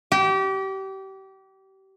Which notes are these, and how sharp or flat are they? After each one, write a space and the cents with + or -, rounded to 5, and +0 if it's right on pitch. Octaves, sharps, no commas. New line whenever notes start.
G4 -30